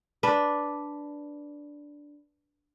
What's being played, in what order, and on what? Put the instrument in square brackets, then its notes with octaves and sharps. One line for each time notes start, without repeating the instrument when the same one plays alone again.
[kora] D4 B4